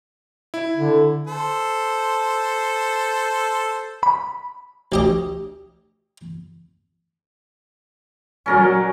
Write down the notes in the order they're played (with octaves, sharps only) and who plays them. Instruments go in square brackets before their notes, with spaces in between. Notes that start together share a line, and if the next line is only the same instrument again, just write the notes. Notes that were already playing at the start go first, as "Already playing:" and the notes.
[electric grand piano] E4
[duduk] D3
[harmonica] A4 C5
[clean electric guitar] B5
[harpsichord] D2 G4 D#5
[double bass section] F#3 [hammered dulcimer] C#4 A#4 D5